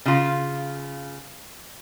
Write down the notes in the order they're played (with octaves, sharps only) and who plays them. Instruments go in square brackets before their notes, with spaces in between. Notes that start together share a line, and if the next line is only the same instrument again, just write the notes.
[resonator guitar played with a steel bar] C#3 F4